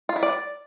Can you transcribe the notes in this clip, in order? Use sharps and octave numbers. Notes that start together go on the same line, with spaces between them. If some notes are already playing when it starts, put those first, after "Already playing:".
F4
E4
D5